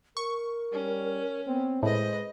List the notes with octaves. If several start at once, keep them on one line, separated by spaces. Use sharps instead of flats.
A#4 C#6
G3 C#4
B3 C4
A2 G#3 B4 C5 D#5